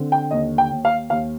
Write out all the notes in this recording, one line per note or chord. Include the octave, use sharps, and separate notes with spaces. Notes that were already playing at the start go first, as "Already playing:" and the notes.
Already playing: D3 C4
G5
D#2 D#5
G5
D#2
F5
D#2 F5